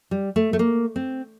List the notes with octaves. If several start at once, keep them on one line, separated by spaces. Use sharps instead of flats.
G3
A3
A3
A#3
C4